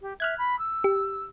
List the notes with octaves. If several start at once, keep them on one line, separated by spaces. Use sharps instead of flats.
G4
E5 F6 F#6 G#6
B5
E6
G4